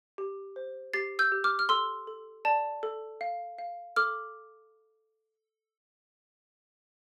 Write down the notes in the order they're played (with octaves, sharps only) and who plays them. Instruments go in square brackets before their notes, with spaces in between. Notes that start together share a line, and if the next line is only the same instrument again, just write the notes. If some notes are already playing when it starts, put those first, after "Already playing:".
[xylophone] G4
C5
G4 A6 C7
E6 G6
G4
D6 F6
F6
A4 C6 E6
A4
D5 A5
A4
F5
F5
A4 D6 F6